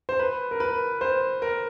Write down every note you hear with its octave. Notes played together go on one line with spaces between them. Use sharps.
C5
B4
A#4
B4
C5
A#4